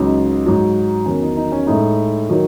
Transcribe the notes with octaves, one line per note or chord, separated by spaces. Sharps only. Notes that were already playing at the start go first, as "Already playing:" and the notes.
Already playing: C#2 C#3 F#3 D#4
G#2 F#3
E2 D#3 F#3 C#4
D#4
D#4
C#4
A2 G#3 D#4
D#3 F#3